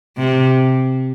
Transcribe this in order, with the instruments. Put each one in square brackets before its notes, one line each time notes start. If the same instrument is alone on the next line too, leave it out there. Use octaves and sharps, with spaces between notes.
[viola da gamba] C3